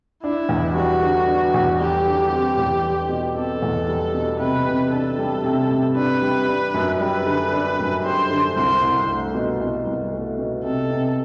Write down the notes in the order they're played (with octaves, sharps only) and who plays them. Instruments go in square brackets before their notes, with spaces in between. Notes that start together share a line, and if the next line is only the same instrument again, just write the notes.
[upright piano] D4 [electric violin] E4
[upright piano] E2
[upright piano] G3 [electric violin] F#4
[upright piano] D3
D4
E2
[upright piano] G3 [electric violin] G4
[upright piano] D3
C4
E2
G3
B2
[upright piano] C4 [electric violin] A4
[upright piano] E2
G3
B2
[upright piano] C3 [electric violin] B4
[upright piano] C3
[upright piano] D4 [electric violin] A4
[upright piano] G3
C3
C3
[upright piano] D4 [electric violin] B4
[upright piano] G3
D4
F#2
[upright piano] G3 [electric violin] B4
[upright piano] D3
D4
F#2
[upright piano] G3 [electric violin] C5
[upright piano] D3
[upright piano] C2 [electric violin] C5
[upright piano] C2
A3
B2
C2
C2
A3
B2
[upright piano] C3 [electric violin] A4
[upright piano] C3